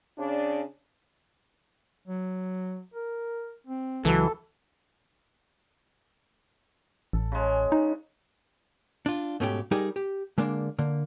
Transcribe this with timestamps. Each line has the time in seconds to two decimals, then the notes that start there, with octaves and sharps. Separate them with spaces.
0.18 C#3 D4
2.07 F#3
2.94 A#4
3.67 C4
4.05 C#2 E3 F#3 A4
7.13 A1 A4
7.32 C#3 G#3
7.72 D#4
9.06 D4 F4
9.40 G#2 B2 A3 C#4 F4 G4
9.71 G3 D#4 G4 G#4 A#4 D5
9.96 G4
10.38 D3 G#3 A#3 D4
10.79 D3 A#3